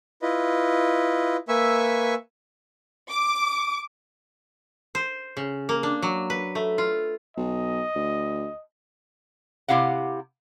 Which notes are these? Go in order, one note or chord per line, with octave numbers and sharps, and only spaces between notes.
E4 F4 B4 D#5
A#3 B4 E5 G#5 C#6 E6
D6
C5
C#3
A#3
D4
F#3
B4
A3
F4
B1 D#5
D2
C3 E4 G4 F5 F#5